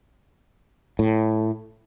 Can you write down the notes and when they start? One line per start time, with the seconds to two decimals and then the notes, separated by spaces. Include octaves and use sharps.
0.99 A2